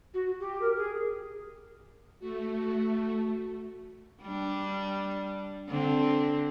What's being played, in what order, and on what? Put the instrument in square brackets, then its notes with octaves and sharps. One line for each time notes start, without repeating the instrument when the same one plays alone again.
[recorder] F#4
G4
A#4
G#4
[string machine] A3 [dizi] F#4
[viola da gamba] G3 D4
D3 C4